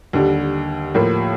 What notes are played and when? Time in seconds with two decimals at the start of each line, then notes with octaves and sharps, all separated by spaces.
0.13 D#2 D3 G3
0.94 A2 F3 A#3